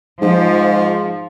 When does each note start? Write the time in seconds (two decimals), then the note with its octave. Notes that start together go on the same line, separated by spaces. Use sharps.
0.22 G#2 F3